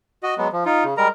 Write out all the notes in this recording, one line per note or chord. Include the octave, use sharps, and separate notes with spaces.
F#4 D#5
F#3 G#3 B3
F3
D#4 F4
C#3
G3 G#3 A#4 A#5